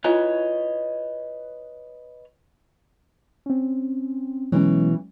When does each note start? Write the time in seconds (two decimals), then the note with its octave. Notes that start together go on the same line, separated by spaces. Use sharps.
0.04 E4 F4 B4 C#5 D#5 G#5
3.46 C4 C#4
4.52 B2 E3 F#3 G#3 C#4